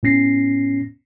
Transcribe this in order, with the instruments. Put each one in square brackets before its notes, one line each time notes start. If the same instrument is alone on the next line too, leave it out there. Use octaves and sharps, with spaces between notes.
[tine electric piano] A2 B3 C#4 A#6 C7